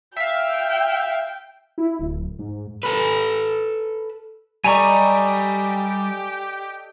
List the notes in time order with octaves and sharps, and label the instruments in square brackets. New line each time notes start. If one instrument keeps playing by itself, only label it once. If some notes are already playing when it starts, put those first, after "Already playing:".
[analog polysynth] E5 F5 [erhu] G5
[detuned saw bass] E4
D1
G#2
[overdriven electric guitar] A4 B4
[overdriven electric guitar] G3 [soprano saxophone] G4 [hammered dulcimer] A4 D5 D#5 [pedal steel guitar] G#5 A#5 C#6